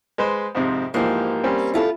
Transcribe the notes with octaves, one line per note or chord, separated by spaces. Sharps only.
G#3 B4 C5
F2 G#2 C3
G#2 E3 F3 A#3 G4
G3 C4 C#4
E4 F4 A4